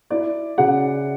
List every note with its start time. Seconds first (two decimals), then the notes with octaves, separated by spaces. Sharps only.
0.10 E4 D5
0.58 C#3 F#5